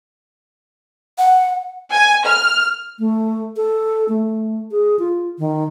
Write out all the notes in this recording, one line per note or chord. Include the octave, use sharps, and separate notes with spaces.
F#5
G#5
F6
A3
A4
A3
G#4
F4
D#3